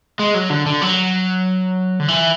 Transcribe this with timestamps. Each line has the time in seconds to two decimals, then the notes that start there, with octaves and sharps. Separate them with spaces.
0.19 G#3
0.34 F#3
0.50 D3
0.66 D3
0.82 F#3
2.00 D3
2.08 E3